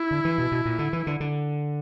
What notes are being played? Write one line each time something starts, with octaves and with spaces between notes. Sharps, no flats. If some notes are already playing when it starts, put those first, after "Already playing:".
Already playing: E4
D3
E3
B2
B2
A#2
D3
E3
D3
D3